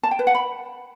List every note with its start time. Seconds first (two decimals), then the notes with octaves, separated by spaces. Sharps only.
0.03 A5
0.11 G5
0.19 B4
0.27 F#5
0.35 B5